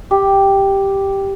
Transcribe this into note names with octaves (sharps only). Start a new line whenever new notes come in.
G4